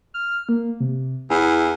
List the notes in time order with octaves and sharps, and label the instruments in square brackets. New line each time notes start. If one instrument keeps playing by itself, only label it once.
[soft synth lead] F6
A#3
C3
[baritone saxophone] E2 [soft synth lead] E4